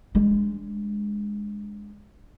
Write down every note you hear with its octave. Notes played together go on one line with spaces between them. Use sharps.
G#3 D4